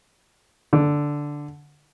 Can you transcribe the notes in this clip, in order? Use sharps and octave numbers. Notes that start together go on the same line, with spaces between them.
D3